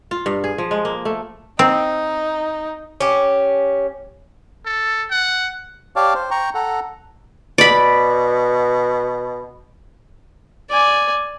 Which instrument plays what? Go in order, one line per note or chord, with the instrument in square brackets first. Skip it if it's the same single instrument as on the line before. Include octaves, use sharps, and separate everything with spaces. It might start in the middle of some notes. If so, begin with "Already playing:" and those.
[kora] F4
G2
G#4
F3
G#3
A#3
A3
[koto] C4 [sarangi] D#4
[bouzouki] C#4 G4
[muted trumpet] A4
F#5
[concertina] G4 C#5 D5 F5 A5
C5
G5 A#5 C#6
A4 F#5 A#5
[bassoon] B2 [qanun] D5 B5
[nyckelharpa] D5 G#5